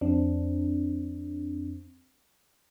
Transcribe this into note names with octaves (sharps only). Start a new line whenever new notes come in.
F2 C4 D4